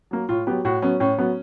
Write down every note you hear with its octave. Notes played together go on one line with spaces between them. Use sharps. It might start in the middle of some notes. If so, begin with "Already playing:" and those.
F#3 A#3
A2 F4
F#3 B3 G4
A2 F#4
F#3 B3 C#4
A2 C#4
F#3 B3